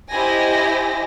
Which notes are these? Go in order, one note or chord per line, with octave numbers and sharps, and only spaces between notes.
E4 G4 C5 D#5 G#5 A#6